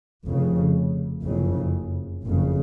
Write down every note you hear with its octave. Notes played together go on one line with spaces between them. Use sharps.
F1 F2 C#3
F#1 F2 C#3
F#1 F2 C#3